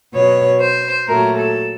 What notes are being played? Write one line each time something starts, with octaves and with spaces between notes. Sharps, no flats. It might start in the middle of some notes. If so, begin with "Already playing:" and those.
B2 F#3 B3 C#5
C5
A#2 F#3 A3 A#4
A4